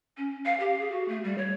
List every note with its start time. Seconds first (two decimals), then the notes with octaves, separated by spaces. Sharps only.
0.17 C#4
0.46 F5
0.60 G4
0.79 G#4
0.92 F#4
1.08 A3
1.24 G3
1.38 C#5